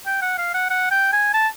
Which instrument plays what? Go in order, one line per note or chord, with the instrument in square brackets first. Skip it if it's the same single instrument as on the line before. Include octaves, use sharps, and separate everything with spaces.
[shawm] G5
F#5
F5
F#5
F#5
G5
G#5
A5